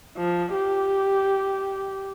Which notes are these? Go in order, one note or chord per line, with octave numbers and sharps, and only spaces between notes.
F3
G4